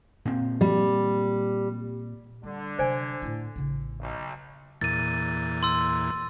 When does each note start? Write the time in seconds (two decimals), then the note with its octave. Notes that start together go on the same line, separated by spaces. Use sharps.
0.25 A#2 C4
0.61 G3
2.43 D3 G3
2.79 C3 F#3 C5 D5 G#5
3.22 A2 E4
3.56 A1 C#3
4.00 B1
4.81 E2 A#2 A6 D#7
5.63 C6 E6